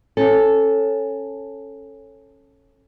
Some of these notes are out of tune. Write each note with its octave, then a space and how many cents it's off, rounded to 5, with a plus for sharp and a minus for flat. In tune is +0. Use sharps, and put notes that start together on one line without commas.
C#4 -15 A4 +0